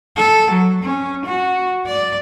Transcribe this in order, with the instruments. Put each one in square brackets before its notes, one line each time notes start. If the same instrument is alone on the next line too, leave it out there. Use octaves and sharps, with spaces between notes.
[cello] A4
F#3
C#4
F#4
D5